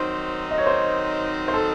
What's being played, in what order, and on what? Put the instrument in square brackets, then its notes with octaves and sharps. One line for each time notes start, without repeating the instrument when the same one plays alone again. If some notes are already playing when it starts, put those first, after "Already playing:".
Already playing: [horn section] D#3 F#3 C4 D#4 [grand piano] C5
[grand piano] D#5
C#5
C5
C5
A4